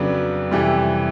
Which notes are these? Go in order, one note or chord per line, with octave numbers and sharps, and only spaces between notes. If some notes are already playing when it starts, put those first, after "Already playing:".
Already playing: F2 C#3 F#3 B3 D4
F2 C3 E3 G3